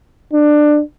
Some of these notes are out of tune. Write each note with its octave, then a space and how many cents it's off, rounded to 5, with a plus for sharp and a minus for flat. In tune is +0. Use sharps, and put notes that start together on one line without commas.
D4 +20